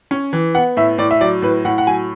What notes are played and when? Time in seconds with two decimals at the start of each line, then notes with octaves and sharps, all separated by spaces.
0.11 C#4
0.33 E3
0.55 B3 F#5
0.77 A2 E5
0.98 A2 D5
1.11 E5
1.21 F#3 D5
1.42 A2 B4
1.65 A2 F#5
1.78 F#5
1.87 F#3 G#5